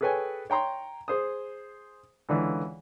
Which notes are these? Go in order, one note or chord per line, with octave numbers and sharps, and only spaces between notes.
G#4 A4 B4 C#5 G5 G#5
C#5 G5 A#5 C6
G#4 C5 D#6
C#2 D3 E3